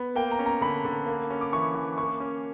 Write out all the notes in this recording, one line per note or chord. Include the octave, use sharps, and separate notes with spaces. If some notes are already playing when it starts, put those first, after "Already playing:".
Already playing: B3
A#3 G5
A#5
C#4
A#5
D3 B5
D3
A#3
C#4
D6
E3 C#6
E3
A#3 C#6
C#4